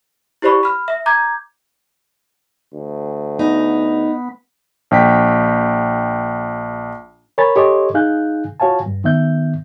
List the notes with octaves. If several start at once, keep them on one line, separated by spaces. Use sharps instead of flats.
E4 G4 C5 D5 B5 C#6
B5 F6
E5
A#5 D6 G6 G#6
D2
B3 D#4
A#1 G5 B6
A#4 C#5 G#5 B5 A6
G4 A4 C#5 D#5 C6 D6
D#4 G#4 F5 G#5 F#6 G6
F4 F#4 C#5 F5 G#5 A5
G2
D#3 B3 E5 G6